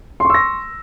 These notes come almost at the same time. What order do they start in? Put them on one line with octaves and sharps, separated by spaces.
C6 C#6 E6 A#6